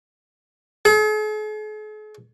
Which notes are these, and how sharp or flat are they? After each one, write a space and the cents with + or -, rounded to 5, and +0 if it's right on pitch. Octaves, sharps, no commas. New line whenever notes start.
G#4 +45